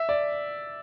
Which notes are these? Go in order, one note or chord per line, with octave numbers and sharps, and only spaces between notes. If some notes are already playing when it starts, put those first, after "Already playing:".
Already playing: E5
D5